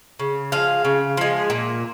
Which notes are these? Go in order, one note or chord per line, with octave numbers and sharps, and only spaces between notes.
C#3
F3 G#3 F5
C#3
F3 G#3
A#2